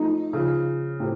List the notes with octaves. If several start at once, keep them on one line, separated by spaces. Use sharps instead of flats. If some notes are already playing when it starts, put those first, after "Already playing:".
Already playing: F3 A3 D#4
C#3 F3
A2 C3